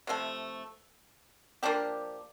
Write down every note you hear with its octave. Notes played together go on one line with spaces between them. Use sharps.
C3 F3 A3
F3 A#3 D4 G4